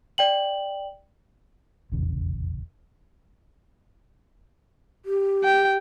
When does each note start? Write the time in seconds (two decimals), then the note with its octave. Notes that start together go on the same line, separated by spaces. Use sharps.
0.18 D5 G5 F#7
1.92 F1 A#1 E2 C#3
5.05 G4
5.44 G5